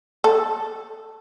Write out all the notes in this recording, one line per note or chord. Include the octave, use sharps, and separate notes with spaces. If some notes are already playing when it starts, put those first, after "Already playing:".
A4